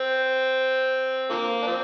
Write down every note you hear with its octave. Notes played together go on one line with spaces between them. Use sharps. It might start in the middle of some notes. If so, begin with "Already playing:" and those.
Already playing: C4
D3 F3 A#3
D4
F3 C4